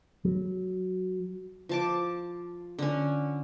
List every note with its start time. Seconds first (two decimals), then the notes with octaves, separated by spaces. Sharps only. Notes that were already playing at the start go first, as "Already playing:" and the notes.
0.25 F#3
1.69 F3 A5 D6
2.79 D3 C#4